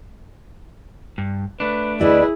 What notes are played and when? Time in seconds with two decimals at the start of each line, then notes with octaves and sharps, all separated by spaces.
1.18 G2
1.60 A3 D4 B4
2.00 D2 E4 G#4 B4 D5 D#5